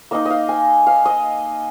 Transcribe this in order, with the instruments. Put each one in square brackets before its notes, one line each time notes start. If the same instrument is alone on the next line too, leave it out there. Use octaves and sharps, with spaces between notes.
[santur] A#3 D#4 D#5
D#5 F5
G#5
F5
D#5